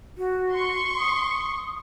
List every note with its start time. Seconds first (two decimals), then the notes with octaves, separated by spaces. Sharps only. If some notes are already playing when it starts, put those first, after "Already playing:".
0.18 F#4
0.54 C6 C#6
0.98 D#6